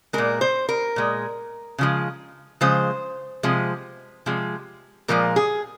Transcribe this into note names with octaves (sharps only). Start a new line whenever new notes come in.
A#2 G#3 A#4
C5
A#4
A#2 G#3
C#3 F3 G#3
C#3 F3 G#3 C5
C3 F3 G#3
C3 F3 G#3
A#2 F3 G#3 A#4
G#4